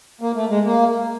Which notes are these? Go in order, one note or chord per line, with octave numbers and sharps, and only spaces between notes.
A#3
A3
G#3
A#3